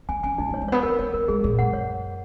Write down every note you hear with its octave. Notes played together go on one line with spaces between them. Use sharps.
C#4 G#5
C#4 G#5
D#3 D#4
E3
C#5
G#3
B3 C#5
C#4 A#4
B3 C#5
B3 A#4
G#3 G#4
A#2 G#4
F#2 F#5
C#5